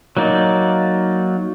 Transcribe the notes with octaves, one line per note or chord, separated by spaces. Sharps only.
F#3 A#3 D#4 D5